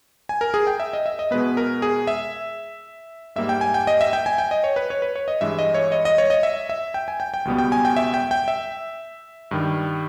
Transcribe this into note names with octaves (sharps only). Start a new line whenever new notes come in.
G#5
A#4
G#4
G5
E5
D#5
E5
D#5
B2 G#3 B3 B4
A#4
G#4
E5
G#2 G3 A#3 E5
G5
G#5
G5
D#5
E5
G5
G#5
G5
D#5
C#5
B4
C#5
B4
C#5
D#5
G2 E3 G#3 E5
D#5
C#5
D#5
D#5
C#5
D#5
E5
E5
G5
G#5
G5
G5
C#2 B2 G3 B3
G5
G#5
G5
E5
G5
G5
E5
G2 D#3 G3